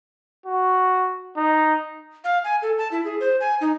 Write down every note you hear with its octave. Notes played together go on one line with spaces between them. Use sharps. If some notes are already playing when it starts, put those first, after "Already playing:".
F#4
D#4
F5
G#5
A4
A5
E4
G#4
C5
G#5
D#4